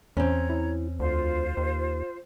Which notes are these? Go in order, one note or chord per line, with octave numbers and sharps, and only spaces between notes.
E2 C4 C#4 C#5 A#5
E4
D2 F4 C5
D#2